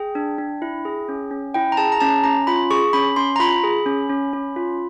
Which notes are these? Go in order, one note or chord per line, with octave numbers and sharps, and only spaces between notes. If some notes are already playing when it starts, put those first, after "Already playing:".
Already playing: G#4 G5
D4
D4
E4
G#4
C#4
C#4
E4 G5
A#5
G#4 A5
A#5
C#4 A5
C#4 A#5
F4 B5
G#4 C#6
C#4 B5
C#4 C6
A#5
F4 B5
G#4
C#4
C#4
C#4
F4